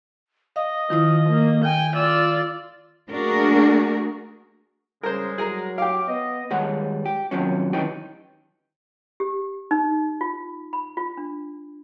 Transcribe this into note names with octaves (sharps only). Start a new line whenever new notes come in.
D#5 F5
D#3 F3 E4 D#6
A#3
G5 G#5
F4 D5 E6
A3 A#3 D4 F#4 G#4 A#4
C#3 G3 G#3 A#4 C5
F#3 G#4 A#4 A#5
G4 F5 D6
B3 D#5
D#2 G3 G#3 C#5 F#5
G4
D#2 C3 F3 F#3 C#4
C2 D#3 E3 C#4 D#4 G4
G4
D#4
F4
B5
F4
D4